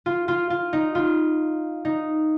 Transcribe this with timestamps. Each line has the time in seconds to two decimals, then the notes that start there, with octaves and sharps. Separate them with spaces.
0.06 F4
0.28 F4
0.50 F4
0.73 D#4
0.95 F4
1.85 D#4